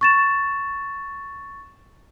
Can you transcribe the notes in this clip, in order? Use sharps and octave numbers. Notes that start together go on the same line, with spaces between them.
C#6 A6 E7